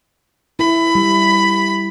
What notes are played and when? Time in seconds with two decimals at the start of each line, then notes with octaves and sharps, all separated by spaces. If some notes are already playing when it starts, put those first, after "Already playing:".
0.59 E4 B5
0.95 G3